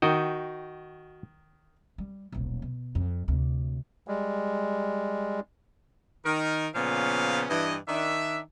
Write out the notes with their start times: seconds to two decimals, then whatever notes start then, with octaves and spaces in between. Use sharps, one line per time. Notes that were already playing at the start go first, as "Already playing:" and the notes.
0.02 D#3 F#4 D#5 G5
1.98 G3
2.32 D#1 B1
2.62 B2
2.95 F2
3.28 D2 C3
4.08 G3 G#3
6.26 D#3 A#4
6.75 A#2 C#3 F3 B3 C#4 F5
7.50 G2 E3 D#5
7.89 D#3 D4 E5